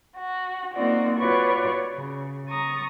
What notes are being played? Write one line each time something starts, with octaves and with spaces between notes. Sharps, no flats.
F#4
A#3 C4 D#4 F4 F#4 D5
F4 F#4 B4 C#5 D5 C#6
C#3
A#5 C#6 D#6 A6